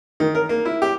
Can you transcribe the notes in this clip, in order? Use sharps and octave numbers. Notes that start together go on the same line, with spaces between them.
D#3
A#4
A#3
E4
G4